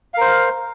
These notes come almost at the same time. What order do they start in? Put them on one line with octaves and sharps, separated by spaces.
F5 A#4 C5